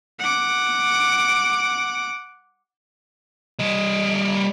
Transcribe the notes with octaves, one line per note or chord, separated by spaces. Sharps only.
F#5 D6
G3 D#5